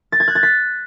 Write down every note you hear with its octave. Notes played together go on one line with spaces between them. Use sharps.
A6
G#6
F#6
A6
B6